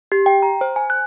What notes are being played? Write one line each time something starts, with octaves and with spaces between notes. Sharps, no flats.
G4
G5
A#5
C5
G#5
F#6